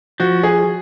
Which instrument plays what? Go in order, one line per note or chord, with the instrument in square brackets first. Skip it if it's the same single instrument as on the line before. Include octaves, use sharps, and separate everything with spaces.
[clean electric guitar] F3 [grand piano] F#4
[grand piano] G#4